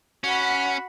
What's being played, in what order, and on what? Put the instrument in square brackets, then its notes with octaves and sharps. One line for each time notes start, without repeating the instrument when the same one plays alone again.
[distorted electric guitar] C#4 [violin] F#4 B5 [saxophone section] F#5